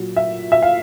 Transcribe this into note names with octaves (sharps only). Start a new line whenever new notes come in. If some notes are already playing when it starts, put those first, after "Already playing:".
Already playing: A#2 F#3
E5
E5
F5